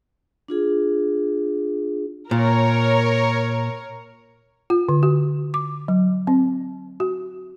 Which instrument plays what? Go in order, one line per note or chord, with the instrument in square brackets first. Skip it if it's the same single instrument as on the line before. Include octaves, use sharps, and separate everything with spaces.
[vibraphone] D4 F4 G#4
[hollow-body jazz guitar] A#2 [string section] A#4 C#5
[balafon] F4
D3
F#4
D6
F#3
C4
F#4